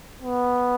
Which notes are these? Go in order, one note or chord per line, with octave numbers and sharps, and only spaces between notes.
B3